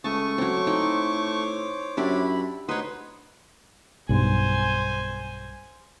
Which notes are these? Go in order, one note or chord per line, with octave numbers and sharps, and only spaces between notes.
C#2 A3 A5 C#6 D#6
F#3 C4 C5 C#5 D6
A2 D#4 G5
F#2 D4 E4 G4 B5
D2 D#4 B4 C#5 F#5 C6
B1 G2 C5 G#5